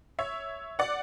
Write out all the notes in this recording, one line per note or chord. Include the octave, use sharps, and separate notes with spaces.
C#5 E5
D5 F#5